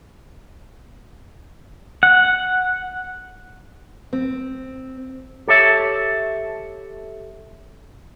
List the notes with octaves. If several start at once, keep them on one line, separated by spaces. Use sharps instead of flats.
F#5
C4
G4 A4 C#5 E5